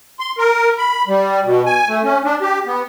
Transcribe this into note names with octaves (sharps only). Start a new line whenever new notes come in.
C6
A#4
B5
G3
B2
G#5
A3
C#4
D4
G4
B3